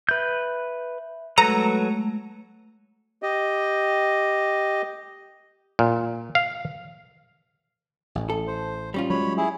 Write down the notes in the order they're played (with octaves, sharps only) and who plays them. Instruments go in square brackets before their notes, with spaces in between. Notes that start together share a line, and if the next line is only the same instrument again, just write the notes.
[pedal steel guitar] B4 G6 [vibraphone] E5
[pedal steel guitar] F#3 A4 B4 [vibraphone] G#3 A3 [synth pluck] A#5
[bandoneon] G4 D#5
[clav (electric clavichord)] A#2
F5
[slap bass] A1 A2
[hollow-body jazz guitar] A4
[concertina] C5
[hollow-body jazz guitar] G3 C#4 F4
[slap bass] F#3 G#3 [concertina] C#5 B5
[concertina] E4 G#4